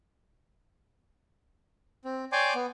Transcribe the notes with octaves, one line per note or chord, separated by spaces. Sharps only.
C4
C#5 D5 G5 G#5 C6 D6
B3